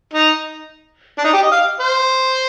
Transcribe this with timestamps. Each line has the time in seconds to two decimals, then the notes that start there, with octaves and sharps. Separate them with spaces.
0.13 D#4
1.18 D4
1.24 D#4
1.33 G4
1.43 D#5
1.52 F5
1.80 C5